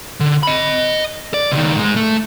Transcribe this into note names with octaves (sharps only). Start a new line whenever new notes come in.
D3
D#5 B5
D5
C#2 D#3
G#2 G#3
A3